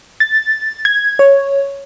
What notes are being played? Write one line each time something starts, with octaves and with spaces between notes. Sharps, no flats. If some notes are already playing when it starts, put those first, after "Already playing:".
A6
G#6
C#5